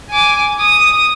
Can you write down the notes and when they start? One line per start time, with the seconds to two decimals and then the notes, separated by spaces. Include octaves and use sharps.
0.10 G#5 D6
0.60 D#6